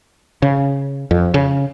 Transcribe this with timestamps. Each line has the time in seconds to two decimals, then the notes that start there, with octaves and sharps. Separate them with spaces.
0.42 C#3
1.11 F2
1.34 C#3